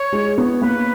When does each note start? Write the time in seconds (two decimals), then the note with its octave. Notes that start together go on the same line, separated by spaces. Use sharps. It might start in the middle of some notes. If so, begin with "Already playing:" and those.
Already playing: C#5
0.12 G#3
0.38 B3
0.62 A#3 B4